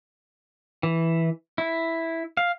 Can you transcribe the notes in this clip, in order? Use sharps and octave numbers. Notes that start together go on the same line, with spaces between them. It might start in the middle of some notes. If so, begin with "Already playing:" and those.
E3
E4
F5